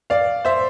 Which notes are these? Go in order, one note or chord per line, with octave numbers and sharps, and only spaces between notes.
D5 F5
C5 E5